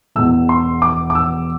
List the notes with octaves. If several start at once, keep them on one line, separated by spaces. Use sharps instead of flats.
E1 E2 B2 E6
C6
D6
D6
E6